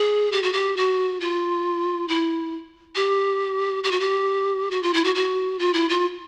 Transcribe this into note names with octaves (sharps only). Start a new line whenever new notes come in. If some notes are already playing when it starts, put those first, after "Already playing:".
Already playing: G#4
G4
F#4
G4
F#4
F4
E4
G4
G4
F#4
G4
F#4
F4
E4
F#4
F#4
F4
E4
F4